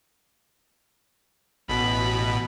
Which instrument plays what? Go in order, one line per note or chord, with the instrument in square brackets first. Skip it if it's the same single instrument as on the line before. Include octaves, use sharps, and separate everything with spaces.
[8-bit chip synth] A1 B2 [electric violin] B5